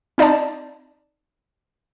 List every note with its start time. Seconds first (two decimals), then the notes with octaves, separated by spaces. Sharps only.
0.18 C4 D#4 D5 D#5 A5